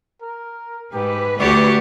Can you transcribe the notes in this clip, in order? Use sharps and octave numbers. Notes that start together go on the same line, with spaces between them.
A#4
G#2 G4 B4
D2 F#4 G4 C#5 D5